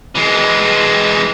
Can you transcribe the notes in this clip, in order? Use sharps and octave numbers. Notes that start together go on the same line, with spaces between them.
E3 G#3